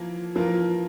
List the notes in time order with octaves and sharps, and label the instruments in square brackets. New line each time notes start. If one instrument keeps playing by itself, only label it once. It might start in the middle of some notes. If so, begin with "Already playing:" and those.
Already playing: [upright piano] E3 A#3 F4 A#4 [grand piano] F3
[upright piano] E3 A#3 F4 A#4 [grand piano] F3